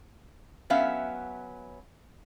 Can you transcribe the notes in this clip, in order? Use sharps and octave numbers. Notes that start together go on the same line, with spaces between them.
F#3 B3 C#4 E5 F5